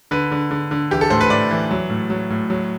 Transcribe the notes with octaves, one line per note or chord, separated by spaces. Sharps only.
D3 B4
D3
D3
D3
E3 G4
A4
A2 C5
B4
A2 D5
E3
F#3
A2
F#3
A2
F#3